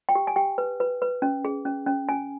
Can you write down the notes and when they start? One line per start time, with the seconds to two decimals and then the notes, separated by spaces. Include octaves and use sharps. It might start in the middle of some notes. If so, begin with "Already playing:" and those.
0.09 G5
0.15 G4
0.27 G#5
0.36 G4 G5
0.58 B4
0.80 B4
1.02 B4
1.22 C#4
1.45 G#4
1.65 C#4
1.87 C#4
2.09 C#4 G#5